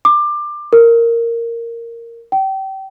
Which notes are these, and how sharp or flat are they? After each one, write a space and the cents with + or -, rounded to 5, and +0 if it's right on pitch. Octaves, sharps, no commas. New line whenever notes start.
D6 +20
A#4 -10
G5 -30